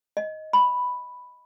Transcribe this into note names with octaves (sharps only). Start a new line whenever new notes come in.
D#5
B5